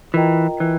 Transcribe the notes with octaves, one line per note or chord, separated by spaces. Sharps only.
E3 F4 A#4 D#5 G5 A#5
E3